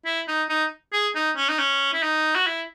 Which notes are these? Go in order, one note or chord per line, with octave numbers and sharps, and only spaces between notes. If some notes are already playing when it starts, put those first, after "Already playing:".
E4
D#4
D#4
G#4
D#4
C#4
D#4
C#4
E4
D#4
F#4
E4